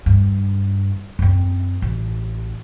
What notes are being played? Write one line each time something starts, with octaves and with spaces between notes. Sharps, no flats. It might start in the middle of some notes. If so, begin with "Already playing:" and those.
G2
F#2 C4
A1